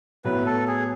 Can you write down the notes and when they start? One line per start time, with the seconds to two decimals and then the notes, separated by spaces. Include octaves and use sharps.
0.24 A2 F#3 B3 B4
0.46 A4
0.67 G#4